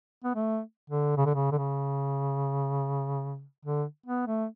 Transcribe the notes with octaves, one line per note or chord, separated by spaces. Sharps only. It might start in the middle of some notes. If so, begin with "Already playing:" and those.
B3
A3
D3
C#3
D3
C#3
D3
C#3
D3
B3
A3